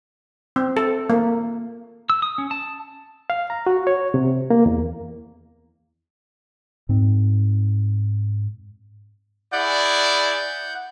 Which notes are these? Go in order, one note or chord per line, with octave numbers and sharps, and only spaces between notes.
C4
A4
A#3
E6
D#6
C#4
A5
F5
A#5
F#4
C#5
C3
A#3
E2
G#2 C4
E4 G#4 D5 F#5 G6